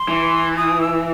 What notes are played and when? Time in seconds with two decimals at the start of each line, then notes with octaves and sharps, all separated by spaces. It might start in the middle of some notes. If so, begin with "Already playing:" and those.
Already playing: C6
0.08 E3
0.57 D#6
0.81 E6